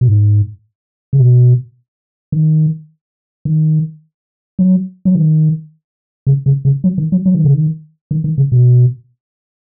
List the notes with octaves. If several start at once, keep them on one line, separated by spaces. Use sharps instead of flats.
B2
G#2
C#3
B2
D#3
D#3
F#3
F#3
D#3
C#3
C#3
C#3
F#3
D#3
F#3
F#3
D#3
C#3
D#3
D#3
D#3
C#3
B2